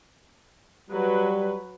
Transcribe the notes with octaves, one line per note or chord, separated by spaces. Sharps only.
F#3 G3 B4